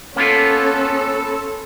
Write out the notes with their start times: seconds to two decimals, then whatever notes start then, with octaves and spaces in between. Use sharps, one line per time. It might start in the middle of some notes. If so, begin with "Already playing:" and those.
0.16 A#3 B3 C#4 F4 A4